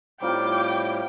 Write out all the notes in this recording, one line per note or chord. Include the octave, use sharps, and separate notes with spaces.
A2 G3 C4 D#4 F4 G5 D6